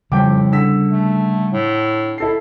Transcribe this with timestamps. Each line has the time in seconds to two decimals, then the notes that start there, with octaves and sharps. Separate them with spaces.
0.12 F2 A2 C#3 G3 G5 D6
0.52 D3 E6 B6
0.91 A3
1.52 A2
2.18 E4 A4 C7